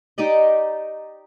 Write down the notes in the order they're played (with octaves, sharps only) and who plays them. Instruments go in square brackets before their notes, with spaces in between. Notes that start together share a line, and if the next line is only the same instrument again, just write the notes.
[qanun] D#4 G4 D5 D#5